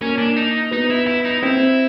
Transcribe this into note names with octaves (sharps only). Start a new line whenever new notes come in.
A#3 C#4
D4
D#4
B3 D#4
E4
E4
D#4
C4 E4